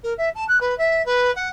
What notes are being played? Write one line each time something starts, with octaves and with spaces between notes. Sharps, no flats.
A#4
E5
A5
F#6
B4
E5
B4
F#5